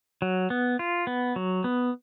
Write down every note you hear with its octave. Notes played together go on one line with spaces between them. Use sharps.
F#3
B3
F4
B3
F#3
B3